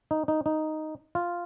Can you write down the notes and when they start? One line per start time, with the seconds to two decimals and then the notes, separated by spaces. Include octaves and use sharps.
0.11 D#4
0.28 D#4
0.46 D#4
1.15 F4